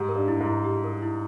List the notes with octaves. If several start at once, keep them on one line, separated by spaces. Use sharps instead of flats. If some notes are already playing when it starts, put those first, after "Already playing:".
Already playing: G#2 G#3 G4
A#4
G2 G3
E4
G#2 G#3
E4
G4
A#4
E4